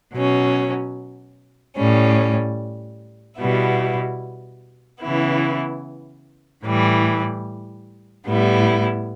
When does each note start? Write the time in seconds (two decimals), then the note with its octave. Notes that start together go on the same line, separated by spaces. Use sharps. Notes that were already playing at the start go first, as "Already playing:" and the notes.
0.13 B2 F#3 C#4
1.75 A2 G3 C#4
3.38 B2 G3 B3 E4
5.01 C#3 E3 B3 E4
6.64 A2 E3 G3
8.27 A2 G3 B3 E4